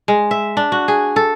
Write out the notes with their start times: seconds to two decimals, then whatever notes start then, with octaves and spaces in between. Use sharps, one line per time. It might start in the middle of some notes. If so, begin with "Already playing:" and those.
0.08 G#3
0.31 E5
0.57 D4
0.72 F#4
0.88 G#4
1.16 A4